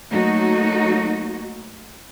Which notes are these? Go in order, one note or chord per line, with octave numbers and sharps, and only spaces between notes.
F#3 A3 A#3 D#4 F#4